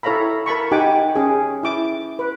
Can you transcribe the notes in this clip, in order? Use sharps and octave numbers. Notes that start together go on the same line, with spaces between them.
E4 A4 C#5 F5 A#5 B5
A#4 A5 B5 C#6
D#4 G4 F#5 G#5 D6
C#4 G#4
E4 D6
B4